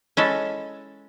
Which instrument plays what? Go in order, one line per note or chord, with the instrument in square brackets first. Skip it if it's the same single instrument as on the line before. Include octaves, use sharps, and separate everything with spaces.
[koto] G#3 C#4 E4 A4